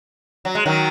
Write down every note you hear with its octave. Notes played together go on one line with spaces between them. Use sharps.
F#3
G#3
D#3 F#3